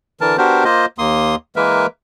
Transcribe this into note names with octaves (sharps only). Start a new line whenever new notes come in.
D3 E3 A#4 A5
B3 D4 F#4 G4 A#4 C5
A#3 F4 C5 D#5
D#2 A#3 C6 D#6
E3 G#3 A#3 A#4 B4 E5